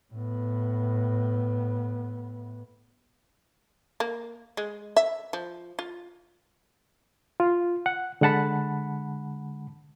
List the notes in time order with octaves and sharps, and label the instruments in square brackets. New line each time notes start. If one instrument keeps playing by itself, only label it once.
[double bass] A2 B3
[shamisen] A#3
G#3
E5
F3
F4
[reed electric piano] F4
F#5
D3 G#3 F#5 A5 B5